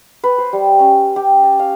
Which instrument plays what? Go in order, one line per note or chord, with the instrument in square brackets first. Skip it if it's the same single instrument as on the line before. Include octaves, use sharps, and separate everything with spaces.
[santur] B4
C5
G3
C#4
G4
A5
F5